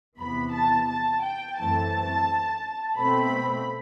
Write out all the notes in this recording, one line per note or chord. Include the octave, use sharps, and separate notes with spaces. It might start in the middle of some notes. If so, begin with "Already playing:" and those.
E2 C3 E3 B3 B5
A5
A5
G5
F#2 E3 A3 C4 A5
B2 A3 C4 B5